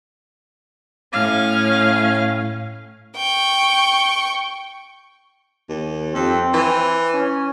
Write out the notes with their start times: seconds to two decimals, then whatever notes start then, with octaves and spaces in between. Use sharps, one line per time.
1.13 A2 C#4 F5
3.17 G5 C#6
5.69 D#2
6.15 F2 C4
6.54 E3
7.14 C#4